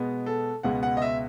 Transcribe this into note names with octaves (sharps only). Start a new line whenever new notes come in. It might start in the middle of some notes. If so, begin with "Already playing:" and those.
Already playing: B2 G#3 B3
A4
C#2 B2 G#3 B3 F#5
F#5
D#5
E5